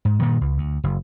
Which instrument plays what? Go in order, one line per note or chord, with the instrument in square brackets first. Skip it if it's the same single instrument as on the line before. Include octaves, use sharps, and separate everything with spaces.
[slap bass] G#2
G2 A#2 D#3 F#3
C#2
D2
F#1